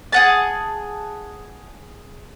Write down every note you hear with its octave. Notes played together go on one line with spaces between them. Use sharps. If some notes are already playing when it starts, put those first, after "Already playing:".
G#4 F#5 A5